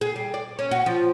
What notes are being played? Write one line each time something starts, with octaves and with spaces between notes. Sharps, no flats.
G#4
G3
D5
C#4
F#4
F3